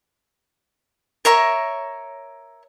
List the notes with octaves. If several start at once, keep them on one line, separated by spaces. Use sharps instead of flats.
A#4 C#5 E5 A#5